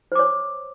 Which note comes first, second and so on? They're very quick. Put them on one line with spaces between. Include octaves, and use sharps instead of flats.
C5 D6 C#5